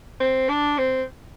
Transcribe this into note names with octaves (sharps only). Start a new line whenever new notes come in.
C4
D4
C4